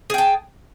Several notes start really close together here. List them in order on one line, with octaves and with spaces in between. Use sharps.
G#4 G5 A5